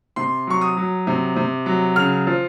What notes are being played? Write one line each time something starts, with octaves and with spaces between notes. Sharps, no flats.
C3 C6
F#3 C#6
D#6
F#3
C3
C3
F#3
C#3 F6
F3